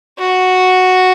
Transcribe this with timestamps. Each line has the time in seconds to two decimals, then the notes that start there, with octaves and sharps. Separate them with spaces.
0.19 F#4